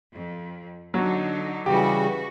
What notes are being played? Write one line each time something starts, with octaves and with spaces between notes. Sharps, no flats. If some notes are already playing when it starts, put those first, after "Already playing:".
F2
D3 F#3 D#4
C#3 E3 G3 F#4 G4